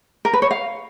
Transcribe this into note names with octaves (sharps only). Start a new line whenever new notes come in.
A#4
B4
C#5
F5